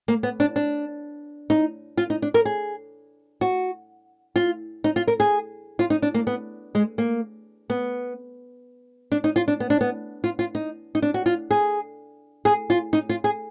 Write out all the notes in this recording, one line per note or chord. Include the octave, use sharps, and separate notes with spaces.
A#3
B3
D4
D4
D#4
F4
D#4
D4
A#4
G#4
F#4
F4
D#4
F4
A#4
G#4
F4
D#4
D4
A#3
B3
G#3
A#3
B3
D4
D#4
F4
D4
B3
D4
B3
F4
F4
D#4
D#4
D4
F#4
F4
G#4
G#4
F4
D#4
F4
G#4